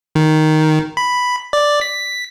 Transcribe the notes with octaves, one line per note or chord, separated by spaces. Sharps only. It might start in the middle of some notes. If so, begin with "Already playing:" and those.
D#3
B5
D5
B6